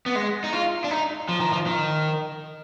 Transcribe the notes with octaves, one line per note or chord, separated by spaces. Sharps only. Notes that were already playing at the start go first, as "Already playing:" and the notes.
B3
G#3
D#4
F4
D4
D#4
F3
D#3
F3
D#3